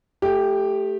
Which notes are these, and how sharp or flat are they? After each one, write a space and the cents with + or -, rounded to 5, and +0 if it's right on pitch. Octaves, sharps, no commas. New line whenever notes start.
A3 -15 G4 +0